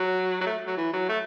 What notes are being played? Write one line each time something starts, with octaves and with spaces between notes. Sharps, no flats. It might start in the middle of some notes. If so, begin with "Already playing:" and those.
Already playing: F#3
F#3
A3
F#3
E3
F#3
A3